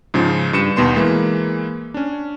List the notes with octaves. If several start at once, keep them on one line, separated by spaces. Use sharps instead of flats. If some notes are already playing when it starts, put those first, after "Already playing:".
G#2 C#3 F3
G2 C#7 E7
D#2 B2 B3 C6 E7
E3 G#3 A#3
C#4 D4